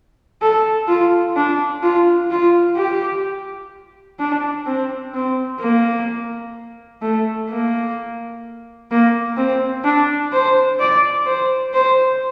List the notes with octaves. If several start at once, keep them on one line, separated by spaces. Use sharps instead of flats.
A4
F4
D4
F4
F4
G4
D4
C4
C4
A#3
A3
A#3
A#3
C4
D4
C5
D5
C5
C5